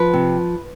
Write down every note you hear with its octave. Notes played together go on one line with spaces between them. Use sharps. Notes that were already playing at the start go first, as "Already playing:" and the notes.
Already playing: F3 B4
C3